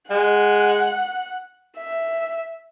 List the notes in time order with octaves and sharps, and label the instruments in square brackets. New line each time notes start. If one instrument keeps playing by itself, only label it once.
[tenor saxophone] G#3 [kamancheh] F#5
[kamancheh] E5